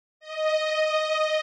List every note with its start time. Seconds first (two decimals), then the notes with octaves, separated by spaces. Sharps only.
0.20 D#5